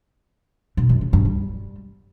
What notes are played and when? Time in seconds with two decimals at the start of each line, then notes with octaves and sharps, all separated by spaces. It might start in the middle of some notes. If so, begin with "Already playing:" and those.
0.77 B2
0.89 F#2
1.01 C#3
1.13 G2
1.25 G3